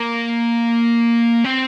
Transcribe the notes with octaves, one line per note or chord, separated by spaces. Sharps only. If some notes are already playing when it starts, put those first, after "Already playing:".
Already playing: A#3
C4